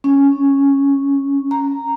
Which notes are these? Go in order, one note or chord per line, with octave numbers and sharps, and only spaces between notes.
C#4
A#5